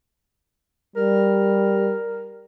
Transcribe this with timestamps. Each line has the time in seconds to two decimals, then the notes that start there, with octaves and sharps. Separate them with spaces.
0.96 G3 A#4